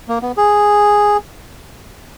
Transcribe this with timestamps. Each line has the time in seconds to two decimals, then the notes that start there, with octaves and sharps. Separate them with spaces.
0.08 A#3
0.22 B3
0.37 G#4